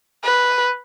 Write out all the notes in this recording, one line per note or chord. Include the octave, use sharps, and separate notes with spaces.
B4